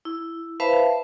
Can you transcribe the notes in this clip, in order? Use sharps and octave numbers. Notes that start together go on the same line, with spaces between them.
E4
B4 C5 E5 F5 A5 B5